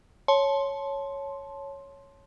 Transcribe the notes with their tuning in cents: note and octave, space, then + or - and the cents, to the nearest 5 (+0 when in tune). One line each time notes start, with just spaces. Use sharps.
C#5 +0 A5 -15 C6 +5